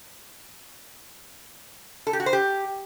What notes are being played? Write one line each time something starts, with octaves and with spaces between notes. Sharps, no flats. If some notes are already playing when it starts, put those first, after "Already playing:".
A4
G4
F#4
C5
G4